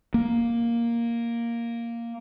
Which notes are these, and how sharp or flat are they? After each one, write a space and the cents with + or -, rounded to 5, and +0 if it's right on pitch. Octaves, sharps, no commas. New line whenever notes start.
A#3 +0